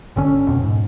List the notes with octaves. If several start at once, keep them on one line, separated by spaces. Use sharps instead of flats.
G1 D3 C#4
F2 B2
G#2